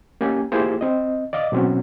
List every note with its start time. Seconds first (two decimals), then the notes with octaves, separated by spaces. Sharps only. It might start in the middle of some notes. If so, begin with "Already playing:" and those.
0.21 A#3 C#4 G4 G#5
0.52 A#3 E4 F4 G4 G#4 C5
0.81 C4 D#5
1.33 D5 D#5 F5 D6
1.52 B2 F#3 C4 C#4